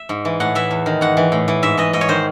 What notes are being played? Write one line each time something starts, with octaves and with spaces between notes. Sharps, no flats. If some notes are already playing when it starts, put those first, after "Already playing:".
Already playing: E5
G#2
E3
A2 F#5
E3 E5
E2
D#3
G#2 F#5
E3
A2
E3
G#2 E5
E3 D#5
G#2 D#5
C#5
D#3 C5